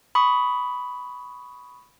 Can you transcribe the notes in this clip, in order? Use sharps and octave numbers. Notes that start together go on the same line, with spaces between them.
B5 C#6 D#6